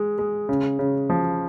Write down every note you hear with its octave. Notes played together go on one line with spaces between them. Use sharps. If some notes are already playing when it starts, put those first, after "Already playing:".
Already playing: G#3
G#3
C#3
C#3
F3